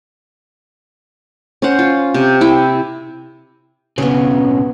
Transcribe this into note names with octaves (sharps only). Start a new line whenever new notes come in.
C#4 C5 F#5
F4
C3
E4 G5
B1 C#3 B3 C#5